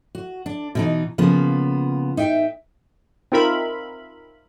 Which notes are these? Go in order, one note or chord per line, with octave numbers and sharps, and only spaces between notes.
F#4
D4
B2 E3 D#4
C#3 F3 A#3 B3
D#4 E5 G5
C4 D#4 F4 A#4 E5 B5